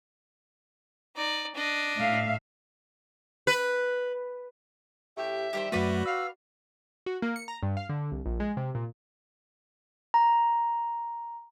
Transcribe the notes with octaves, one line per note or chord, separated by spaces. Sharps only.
D#4 D5
D4 D#5
A2 E5 F5
B4
A2 C#4 G4 E5
D#3 E3 G3 G4 A#4 C5
F#2 F#3 A3 F#4 B4 D5 B5
F5 E6
F#4
A#3
C#7
A#5
G2
F5
D3
C2
A#1
G#3
C3
A#2
A#5